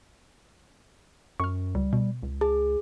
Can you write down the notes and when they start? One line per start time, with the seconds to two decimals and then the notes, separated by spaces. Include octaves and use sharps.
1.40 F#2 C#6 F6
1.75 C#2 G3
1.93 B2
2.23 C#2
2.41 G#4 A5